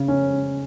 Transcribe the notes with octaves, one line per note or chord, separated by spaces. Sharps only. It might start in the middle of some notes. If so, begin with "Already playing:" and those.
Already playing: C#3
C#4